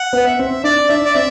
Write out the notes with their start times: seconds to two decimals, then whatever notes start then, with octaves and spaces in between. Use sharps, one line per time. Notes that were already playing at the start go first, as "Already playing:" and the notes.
Already playing: F#5
0.13 B3
0.26 E5
0.39 C4
0.64 D4 D5
0.89 D4 E5
1.05 D5
1.14 C4 E5